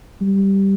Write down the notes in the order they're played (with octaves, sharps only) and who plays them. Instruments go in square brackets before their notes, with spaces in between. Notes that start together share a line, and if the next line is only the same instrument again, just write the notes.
[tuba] G3